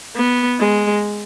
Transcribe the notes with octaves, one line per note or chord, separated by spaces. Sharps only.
B3
G#3